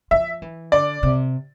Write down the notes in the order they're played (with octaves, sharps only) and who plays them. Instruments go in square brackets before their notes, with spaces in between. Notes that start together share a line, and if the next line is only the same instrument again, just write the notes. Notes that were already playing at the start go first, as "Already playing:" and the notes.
[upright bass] F3 [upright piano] E5
[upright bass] E3
[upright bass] D3 [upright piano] D5
[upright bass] C3